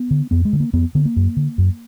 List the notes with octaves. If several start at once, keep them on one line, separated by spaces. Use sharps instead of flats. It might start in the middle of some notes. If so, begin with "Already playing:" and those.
Already playing: B3
D3
F2 B3
G#3
D3
A#3
F2 B3
D3 B3
A#3
F#2
D3
F#2